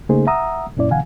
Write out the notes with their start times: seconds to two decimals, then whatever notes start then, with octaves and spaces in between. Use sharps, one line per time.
0.09 C#3 A3 A#3 D#4 G#4 C5
0.27 E5 F#5 A#5 D#6 E6
0.77 F#2 A#2 C#4 E4 D5
0.90 B2 D3 E3 F5 F#5 G#5